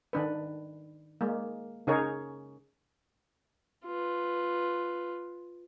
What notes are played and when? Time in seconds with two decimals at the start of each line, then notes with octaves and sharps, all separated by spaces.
0.13 D#3 D4 B4
1.21 G#3 A#3
1.87 C#3 D#4 G#4 A#4 C#5
3.86 F4 B4